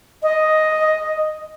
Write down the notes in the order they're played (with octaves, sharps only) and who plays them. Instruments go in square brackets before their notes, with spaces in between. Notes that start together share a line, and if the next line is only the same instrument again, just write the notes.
[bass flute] D#5